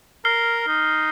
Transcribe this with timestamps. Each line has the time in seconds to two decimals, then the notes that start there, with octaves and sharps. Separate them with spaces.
0.25 A#4 F6 C7 G7
0.67 D#4